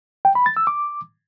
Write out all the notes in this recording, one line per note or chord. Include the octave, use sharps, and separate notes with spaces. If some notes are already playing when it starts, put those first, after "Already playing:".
G5
B5
A6
E6
D6